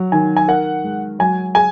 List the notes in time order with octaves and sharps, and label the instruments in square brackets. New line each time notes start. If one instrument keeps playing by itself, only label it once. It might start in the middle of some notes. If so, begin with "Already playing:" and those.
Already playing: [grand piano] F#3
[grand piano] D#3 [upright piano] G#5
[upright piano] G#5
[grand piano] A#4 [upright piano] F#5
[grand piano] G#3
[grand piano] F#3 [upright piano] G#5
[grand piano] G#4 [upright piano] G#5